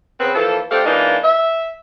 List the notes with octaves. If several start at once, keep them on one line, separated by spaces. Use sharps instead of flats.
C#3 C4 B4
E3 F3 A#3 A4
A3 C4 D4 G4 C5 F5
E3 G#3 A#3 D4 D#4 F4
E5